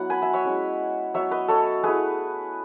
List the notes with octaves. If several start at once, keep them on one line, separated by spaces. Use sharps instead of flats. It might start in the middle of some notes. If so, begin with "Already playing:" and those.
Already playing: F#3 B3 E4 F#5
G#5 B5
E5 G#5
C#5 E5
G#3 C#4 E4
F#3 B3 E4 C#5 E5
B4 D#5
A4 C#5
A3 E4 G#4 B4